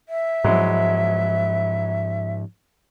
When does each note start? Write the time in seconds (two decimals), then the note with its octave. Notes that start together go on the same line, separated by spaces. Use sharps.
0.09 E5
0.44 G#2 F3 F#3 G#3 E4